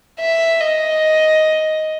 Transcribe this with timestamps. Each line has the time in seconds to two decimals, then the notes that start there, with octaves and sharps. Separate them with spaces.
0.20 E5
0.60 D#5